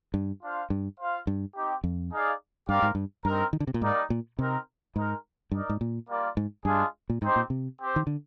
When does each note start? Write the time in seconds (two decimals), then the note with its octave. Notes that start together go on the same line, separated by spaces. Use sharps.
0.14 G2
0.42 D4 F4 C5 F5
0.70 G2
0.99 F4 C5 F5
1.27 G2
1.55 C4 D#4 G4
1.84 F2
2.12 D#4 G#4 D5 F5
2.69 G2 C4 G4 A#4 D5 F5
2.82 G#2
2.95 G2
3.25 G2 C4 D#4 A#4
3.53 D#3
3.60 D3
3.67 C3
3.74 A#2
3.82 G#2 G3 A#3 D#4 A#4 D5
4.10 A#2
4.38 C3 C4 D#4 A#4
4.95 G#2 G#3 D#4 A#4
5.51 G2 D#4 A#4 D5
5.69 G#2
5.81 A#2
6.08 G3 A#3 F4 A#4 D5
6.37 G#2
6.65 G2 G#3 D4 F4 G#4
7.10 A#2
7.22 G#2 C4 D#4 G4 C5
7.36 A#2
7.50 C3
7.79 C4 G4 C5
7.96 D#3
8.07 D3